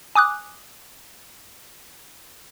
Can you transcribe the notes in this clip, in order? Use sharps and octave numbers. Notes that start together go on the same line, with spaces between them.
G#5 D6 D#6 F#6